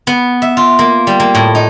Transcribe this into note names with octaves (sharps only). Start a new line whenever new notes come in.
B3
E5
F4
A#3
G3
A#3
A2
D#4